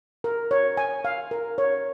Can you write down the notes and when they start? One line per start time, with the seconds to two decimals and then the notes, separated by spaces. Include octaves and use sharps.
0.24 A#4
0.51 C#5
0.77 G#5
1.05 F5
1.31 A#4
1.58 C#5